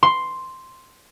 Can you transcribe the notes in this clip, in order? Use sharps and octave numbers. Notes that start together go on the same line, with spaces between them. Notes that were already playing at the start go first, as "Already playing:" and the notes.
C6